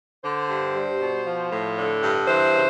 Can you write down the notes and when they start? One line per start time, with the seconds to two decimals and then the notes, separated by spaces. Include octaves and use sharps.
0.24 D3 C5
0.49 G2
0.75 G3
1.00 B2
1.25 F3
1.51 A2
1.77 D3
2.02 G2
2.27 E3 C5
2.53 C#3